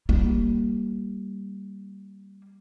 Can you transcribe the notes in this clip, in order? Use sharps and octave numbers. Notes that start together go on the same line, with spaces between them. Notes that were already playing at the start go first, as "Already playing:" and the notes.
G3 A#3